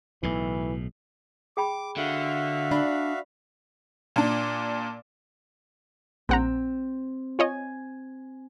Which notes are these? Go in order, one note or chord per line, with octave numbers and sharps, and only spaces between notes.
B1 A2 E3
G#4 G5 B5 D6
D3 F#4 E5 F5
D4 B5
A#2 D4
A#1 C4 F#5 A#5
F4 C#5 D#5 G#5